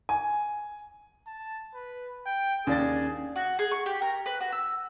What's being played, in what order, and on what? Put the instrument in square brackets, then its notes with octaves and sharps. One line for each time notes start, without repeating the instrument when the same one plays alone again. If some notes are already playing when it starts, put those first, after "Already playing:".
[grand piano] G#5
[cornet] A5
B4
G5
[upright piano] D#2 D4 A6 [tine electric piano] C#4 [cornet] G#4
[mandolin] F#4
G#4
C#6
G4
A#4
B4
F#4
E6